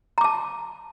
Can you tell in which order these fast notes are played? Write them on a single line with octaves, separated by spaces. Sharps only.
A#5 D6 A5